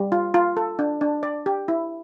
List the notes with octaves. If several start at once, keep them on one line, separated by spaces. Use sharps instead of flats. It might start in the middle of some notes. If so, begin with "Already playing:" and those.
Already playing: G3
F4
F4
A4
D4
D4
D5
G4
E4